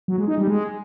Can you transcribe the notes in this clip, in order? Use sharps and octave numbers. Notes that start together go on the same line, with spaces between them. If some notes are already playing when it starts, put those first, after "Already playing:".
F#3
G#3
D#4
G3
G#3